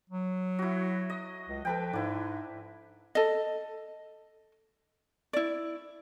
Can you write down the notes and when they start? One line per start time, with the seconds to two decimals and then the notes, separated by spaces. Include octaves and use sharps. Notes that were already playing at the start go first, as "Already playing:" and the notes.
0.10 F#3
0.59 E4 F#4
1.10 D#5
1.49 C#2
1.65 F3 A4 B4 G5
1.93 G#2 D4 E4
3.15 A4 D#5
5.33 E4 D5